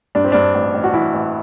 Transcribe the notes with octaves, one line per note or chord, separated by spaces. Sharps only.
G2 D4
C4
G2 D4
A1
A1
F#4
E3 E4
A1